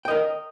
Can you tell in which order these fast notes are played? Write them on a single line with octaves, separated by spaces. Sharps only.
G5 D#5 A#4